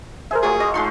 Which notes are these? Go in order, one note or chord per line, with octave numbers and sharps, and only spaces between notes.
G#4 A#4 C5 E5
F#3 A3 F4 G#4
A3 D#5
G#3 D#4 F4 C6 C#6